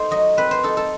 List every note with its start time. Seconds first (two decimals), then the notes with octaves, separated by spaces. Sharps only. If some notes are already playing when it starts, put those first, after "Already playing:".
Already playing: A3 D#4 C5
0.11 F#3 D#5
0.37 C4 B4
0.51 C5
0.63 D#4 A4
0.77 A4